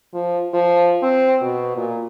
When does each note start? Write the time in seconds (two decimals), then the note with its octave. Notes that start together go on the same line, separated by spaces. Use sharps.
0.14 F3
0.53 F3
1.03 C4
1.41 B2
1.77 A#2